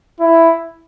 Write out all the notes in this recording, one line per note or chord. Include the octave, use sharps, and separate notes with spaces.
E4